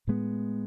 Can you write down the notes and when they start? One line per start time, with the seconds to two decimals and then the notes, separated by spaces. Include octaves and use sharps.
0.07 A2 G#3 B3